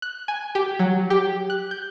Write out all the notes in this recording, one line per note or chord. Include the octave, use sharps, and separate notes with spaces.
F#6
G#5
G4
F#3
G4
F#6
G6